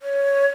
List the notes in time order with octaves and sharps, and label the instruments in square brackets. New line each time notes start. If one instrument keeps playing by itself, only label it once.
[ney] C#5